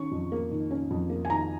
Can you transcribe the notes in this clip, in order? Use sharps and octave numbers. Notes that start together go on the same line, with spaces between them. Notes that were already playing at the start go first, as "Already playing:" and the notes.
Already playing: D#3 C#4 C#6
F2
A#3
D#3
C#4
F2
A#3
G#5
D#3 A#5